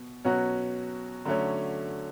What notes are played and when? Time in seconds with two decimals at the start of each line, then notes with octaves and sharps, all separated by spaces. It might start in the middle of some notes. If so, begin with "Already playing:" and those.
Already playing: B2
0.24 B2 F#3 C#4 F#4
1.25 D3 F#3 A3 C#4